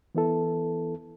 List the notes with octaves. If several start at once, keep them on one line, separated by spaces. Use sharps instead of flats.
E3 B3 E4 A4